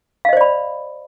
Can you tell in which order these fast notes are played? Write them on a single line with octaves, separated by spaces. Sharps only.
F5 D#5 C5 D5 B5